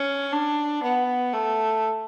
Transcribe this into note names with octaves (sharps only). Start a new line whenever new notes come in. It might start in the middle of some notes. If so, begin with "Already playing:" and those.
Already playing: C#4
D4
B3
A3